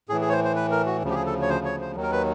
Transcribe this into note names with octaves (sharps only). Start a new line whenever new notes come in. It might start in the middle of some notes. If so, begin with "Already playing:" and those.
A2 E3 G#4
G#4
C#5
C5
C5
B4
A#4
F#4
D2 C#3 F3
G4
G#4
A4
C#5
C5
C#5
C5
D#2 D#3 F#3
A#4
B4